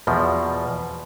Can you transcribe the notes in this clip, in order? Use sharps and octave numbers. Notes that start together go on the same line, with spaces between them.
E2 B2 F3